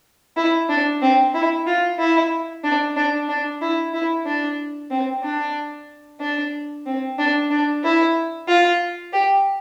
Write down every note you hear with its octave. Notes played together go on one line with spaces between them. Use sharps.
E4
D4
C4
E4
F4
E4
D4
D4
D4
E4
E4
D4
C4
D4
D4
C4
D4
D4
E4
F4
G4